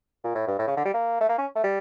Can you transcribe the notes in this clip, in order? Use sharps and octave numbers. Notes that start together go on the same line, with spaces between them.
A#2
A2
G2
A2
C#3
D3
G3
A#3
A3
A#3
C#4
A3
G3